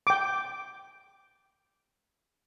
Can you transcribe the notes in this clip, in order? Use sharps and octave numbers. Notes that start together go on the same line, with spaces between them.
G5 D6